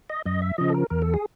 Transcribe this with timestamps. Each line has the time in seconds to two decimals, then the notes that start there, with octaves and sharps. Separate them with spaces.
0.10 D#5
0.25 F#2 D#5
0.42 E5
0.58 C#3 F3 D#5
0.70 A4
0.74 A#4
0.90 E2 A#4
1.02 A4
1.14 G#4